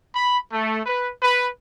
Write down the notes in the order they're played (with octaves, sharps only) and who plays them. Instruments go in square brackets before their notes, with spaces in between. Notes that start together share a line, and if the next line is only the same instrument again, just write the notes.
[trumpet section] B5
A3
B4
B4